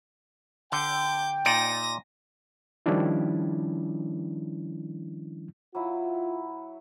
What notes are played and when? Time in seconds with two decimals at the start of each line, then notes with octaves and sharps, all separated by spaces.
0.72 D3 G5 D6 G6
1.45 A#2 D#4 D5 A#6 D#7
2.86 D#3 F3 G3 C#4 D4 E4
5.75 F#3 E4 F4